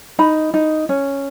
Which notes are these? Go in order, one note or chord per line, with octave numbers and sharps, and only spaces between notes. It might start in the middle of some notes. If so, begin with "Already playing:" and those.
D#4 B5
D#4
C#4